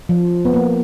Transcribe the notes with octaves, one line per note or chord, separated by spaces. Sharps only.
F3
B3
A#3